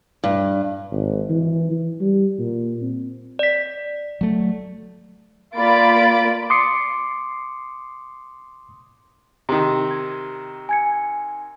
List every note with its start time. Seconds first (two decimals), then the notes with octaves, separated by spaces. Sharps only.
0.24 G2
0.92 G#1
1.30 E3
1.71 E3
2.01 G3
2.39 A#2
2.81 C4
3.39 D5 B6
4.21 F#3 A3
5.55 A#3 F4 D5 B5 A6 D7
6.50 C6 D6 D#6 C7 C#7
9.49 C3 D#3
9.91 G#6
10.69 G#5 G#6 C#7